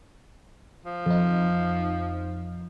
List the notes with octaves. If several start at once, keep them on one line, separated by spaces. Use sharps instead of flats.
F3
F2 D#4